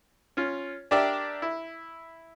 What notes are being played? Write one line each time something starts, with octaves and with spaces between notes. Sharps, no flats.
C#4 F4
D4 G4 A#4 D5 E5 G5
E4